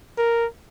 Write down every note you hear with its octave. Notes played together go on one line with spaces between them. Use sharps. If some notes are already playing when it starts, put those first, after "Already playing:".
A#4